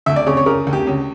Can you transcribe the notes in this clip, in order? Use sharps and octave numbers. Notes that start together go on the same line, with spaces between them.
D2 E5
D5
C#3 C#5
C#5
C#3 A#4
D2
G4
C#2